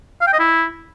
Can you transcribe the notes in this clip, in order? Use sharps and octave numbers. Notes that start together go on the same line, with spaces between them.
F5
G5
D#5
E4